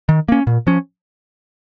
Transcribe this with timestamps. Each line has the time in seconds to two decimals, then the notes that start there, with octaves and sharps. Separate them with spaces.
0.09 D#3
0.28 A#3 C#4
0.47 A#2
0.67 F3 C#4